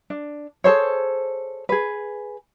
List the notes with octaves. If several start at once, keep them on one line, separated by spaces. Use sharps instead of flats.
D4
G#4 A4 C5 C#5
G#4 B4